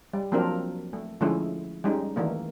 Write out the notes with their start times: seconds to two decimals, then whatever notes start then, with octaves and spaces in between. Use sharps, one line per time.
0.13 G3
0.32 F3 F#3 A#3 C4 D4 A#4
0.93 A3
1.21 D3 F3 G#3 A3 C#4 E4
1.84 G3 G#3 C#4 D#4
2.16 D#3 E3 A3 A#3